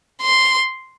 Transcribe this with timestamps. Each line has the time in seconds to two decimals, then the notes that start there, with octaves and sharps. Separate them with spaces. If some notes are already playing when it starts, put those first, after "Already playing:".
0.22 C6